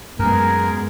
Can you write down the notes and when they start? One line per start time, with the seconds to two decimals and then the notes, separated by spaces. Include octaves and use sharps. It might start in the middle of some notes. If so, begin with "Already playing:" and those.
0.19 F#2 G#3 B3 G#4 A#4